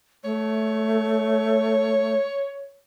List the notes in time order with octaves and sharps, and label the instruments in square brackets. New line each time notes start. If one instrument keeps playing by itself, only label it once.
[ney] A3 [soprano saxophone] C#5